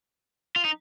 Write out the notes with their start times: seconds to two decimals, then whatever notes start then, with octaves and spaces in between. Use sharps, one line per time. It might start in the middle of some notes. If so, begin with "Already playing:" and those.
0.56 F4
0.65 D#4